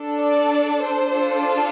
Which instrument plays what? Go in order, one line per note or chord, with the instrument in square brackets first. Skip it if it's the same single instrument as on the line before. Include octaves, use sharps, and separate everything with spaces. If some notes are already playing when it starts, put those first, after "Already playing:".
Already playing: [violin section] D4 A4
D5
C5
D4 F4 A4